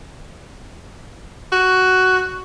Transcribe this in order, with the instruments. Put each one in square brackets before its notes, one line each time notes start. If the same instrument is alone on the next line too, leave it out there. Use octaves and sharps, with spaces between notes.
[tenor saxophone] F#4